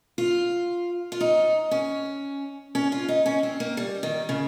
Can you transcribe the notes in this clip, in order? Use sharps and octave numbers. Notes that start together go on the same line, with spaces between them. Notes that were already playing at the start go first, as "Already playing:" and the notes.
F4
F4
D#4
C#4
C#4
F4
D#4
C#4
C4
A#3
G3
D#3
C#3